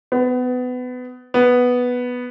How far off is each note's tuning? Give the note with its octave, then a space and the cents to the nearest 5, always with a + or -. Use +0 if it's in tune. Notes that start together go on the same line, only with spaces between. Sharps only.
B3 +25
B3 +0